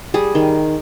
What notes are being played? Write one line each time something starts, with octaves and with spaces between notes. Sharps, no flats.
G3 G#4
D#3